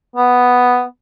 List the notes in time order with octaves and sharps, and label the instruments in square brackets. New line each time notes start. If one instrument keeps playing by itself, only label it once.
[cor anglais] B3